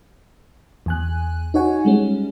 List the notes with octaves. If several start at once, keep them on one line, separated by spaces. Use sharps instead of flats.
E2 G#5 F#6
D#4 F#4 C#5 F#5 G#5
G3 G#3 C#4